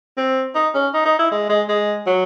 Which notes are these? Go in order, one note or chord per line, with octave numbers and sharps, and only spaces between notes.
C4
D#4
C#4
D#4
D#4
E4
G#3
G#3
G#3
F#3